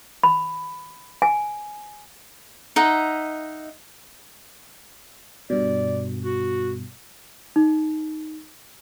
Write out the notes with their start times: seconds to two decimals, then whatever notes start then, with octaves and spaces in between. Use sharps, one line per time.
0.23 B5
1.22 G#5
2.76 D#4 D#5 E5 F#5
5.50 G2 B2 D5
6.23 F#4
7.56 D#4